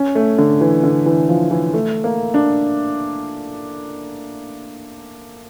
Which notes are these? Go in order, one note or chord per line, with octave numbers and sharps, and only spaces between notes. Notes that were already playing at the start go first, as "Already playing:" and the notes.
Already playing: C#4
A3
D3
E3
D3
E3
F3
E3
A3
A#3
D4